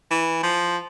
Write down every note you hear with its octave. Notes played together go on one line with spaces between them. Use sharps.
E3
F3